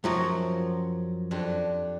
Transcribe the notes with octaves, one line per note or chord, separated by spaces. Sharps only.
F#2 F3 F#3 A#4 F#5 G5
F2 D4 G4